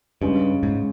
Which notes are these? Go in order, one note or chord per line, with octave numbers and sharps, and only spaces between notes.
G2 C#3 G#3 C#4
G#2